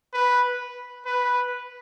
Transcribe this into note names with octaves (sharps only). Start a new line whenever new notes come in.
B4
B4